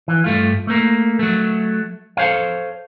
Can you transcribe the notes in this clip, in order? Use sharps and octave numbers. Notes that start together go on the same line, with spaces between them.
E3
G2 A3 F4
A3 A#3
F#3 A3
A4 C5 C#5 F5